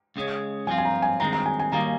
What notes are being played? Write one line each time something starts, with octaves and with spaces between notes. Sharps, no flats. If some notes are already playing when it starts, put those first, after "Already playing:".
C#2 C#3 G#3 C#4
G2 F3 C4 F4 G#5
G#5
A#5
G#5
G2 D#3 G#3 C4 A#5
A#5
G#5
G#5
D#2 D#3 G3 A#3 A#5